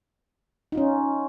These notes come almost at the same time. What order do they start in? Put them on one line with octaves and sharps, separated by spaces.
D#4 F4 C#4